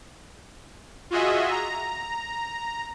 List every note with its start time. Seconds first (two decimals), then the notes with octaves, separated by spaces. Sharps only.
1.10 F4 F#4 G#4 D#5 E5
1.51 A#5